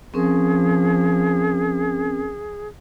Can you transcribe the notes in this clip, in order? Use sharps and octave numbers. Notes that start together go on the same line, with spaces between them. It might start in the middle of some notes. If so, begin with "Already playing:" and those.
F3 C4 C#4 G#4 A#4